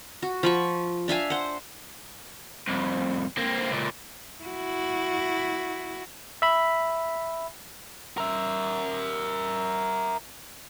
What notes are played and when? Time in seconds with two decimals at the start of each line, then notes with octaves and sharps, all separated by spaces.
0.22 F#4
0.43 F3 B5 C#6
1.08 D4 E5 F5 G#5
1.30 C5 F#5
2.68 C2 F2
3.37 A#3 C4
3.70 C#2 A#2
4.44 E4 F#4
6.42 E5 B5
8.18 A#4 E5